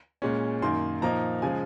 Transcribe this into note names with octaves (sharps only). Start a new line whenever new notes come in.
A#2 G#3 C#4
F#2 D#3 A#3 C6
A#2 F3 A#3 D#4 A#5
C#3 F3 G#3 G#5